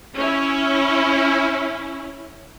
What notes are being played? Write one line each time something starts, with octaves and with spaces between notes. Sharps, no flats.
C#4 E4